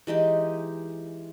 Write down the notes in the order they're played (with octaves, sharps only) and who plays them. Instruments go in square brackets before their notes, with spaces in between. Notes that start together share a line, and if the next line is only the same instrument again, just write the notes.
[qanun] E3 G#3 D#4 G4